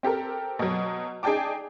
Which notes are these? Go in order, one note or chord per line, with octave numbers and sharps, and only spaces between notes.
C4 G4 A4 A#4
B2 F#3
D#4 G#4 D5 G5 A5 D6